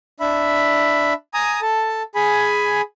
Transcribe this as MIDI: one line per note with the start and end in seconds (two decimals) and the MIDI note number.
0.20 1.13 62
0.20 1.13 76
0.20 1.13 83
1.34 1.60 80
1.34 1.60 82
1.34 1.60 87
1.62 2.03 69
1.62 2.03 81
2.15 2.81 68
2.15 2.81 80
2.15 2.81 83